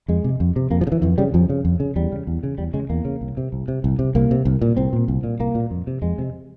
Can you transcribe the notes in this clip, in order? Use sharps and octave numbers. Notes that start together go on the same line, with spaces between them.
F2 G#3
C3
F2
C3
F2 A#3
F3
C#3
E3
F2 E3
C#3 G3
F2 F3
C#3
F2
C#3
E2 G3
C#3
E2
C#3
E2 G3
C#3 G#3
E2 A#3
C#3
C2
C3
C2
C3
C2
C3
C2 A#3
C3
C2
A#2
C2 C4
A#2
C2
A#2
C2 A#3
A#2
F2
C3
F2 G#3
C3